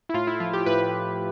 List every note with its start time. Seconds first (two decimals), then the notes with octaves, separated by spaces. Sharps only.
0.09 E4
0.14 A2 F4
0.27 E4
0.40 F3 F4
0.53 G4
0.66 A2 B4